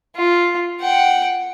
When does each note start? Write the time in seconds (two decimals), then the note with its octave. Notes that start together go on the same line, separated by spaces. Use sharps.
0.17 F4
0.81 F#5 G5